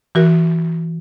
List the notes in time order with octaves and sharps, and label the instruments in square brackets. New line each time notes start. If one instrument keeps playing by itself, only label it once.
[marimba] E3 F#4 A#4